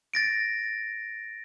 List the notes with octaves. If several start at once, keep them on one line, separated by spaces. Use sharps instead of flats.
A6 A#6 D7